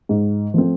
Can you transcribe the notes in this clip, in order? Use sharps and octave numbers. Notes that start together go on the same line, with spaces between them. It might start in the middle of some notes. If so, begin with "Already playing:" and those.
G#2
F3 A3 C4